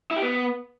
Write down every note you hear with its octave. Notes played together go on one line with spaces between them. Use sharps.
E4
G4
B3